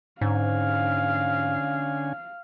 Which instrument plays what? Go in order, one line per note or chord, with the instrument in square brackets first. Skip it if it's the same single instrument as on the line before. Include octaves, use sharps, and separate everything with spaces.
[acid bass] G#2 [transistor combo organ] D3 C#4 G#5 [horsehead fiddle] F5